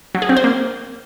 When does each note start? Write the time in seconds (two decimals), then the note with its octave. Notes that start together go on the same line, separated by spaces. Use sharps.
0.15 F#3
0.22 G#4
0.29 C4
0.37 C5
0.44 A#3